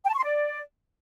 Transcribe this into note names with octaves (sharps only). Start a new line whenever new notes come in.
G5
A5
C#6
C6
D5